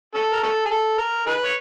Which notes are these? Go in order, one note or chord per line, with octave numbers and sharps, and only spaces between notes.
C#4 A4
A#4
C#4 A4
G#4
A4
A#4
D#4 G#4 B4
C#5